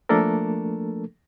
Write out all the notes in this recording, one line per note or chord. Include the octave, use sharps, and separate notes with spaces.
F3 A3 A#3 D4 A4 A#4